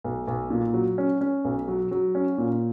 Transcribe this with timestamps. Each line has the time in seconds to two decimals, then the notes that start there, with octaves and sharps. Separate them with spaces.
0.04 B1
0.27 B1
0.50 A#2
0.74 F#3
0.98 C#4
1.21 C#4
1.45 B1
1.68 F#3
1.91 F#3
2.15 C#4
2.38 A#2